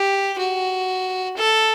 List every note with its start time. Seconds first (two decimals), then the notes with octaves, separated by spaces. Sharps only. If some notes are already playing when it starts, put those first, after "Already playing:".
Already playing: G4
0.38 F#4
1.37 A4